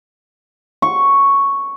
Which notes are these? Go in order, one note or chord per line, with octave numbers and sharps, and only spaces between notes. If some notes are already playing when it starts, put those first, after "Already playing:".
C#6